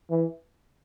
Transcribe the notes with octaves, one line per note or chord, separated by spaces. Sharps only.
E3